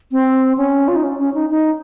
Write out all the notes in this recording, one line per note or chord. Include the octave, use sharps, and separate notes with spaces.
C4
C#4
F4
D#4
C#4
C#4
D#4
D#4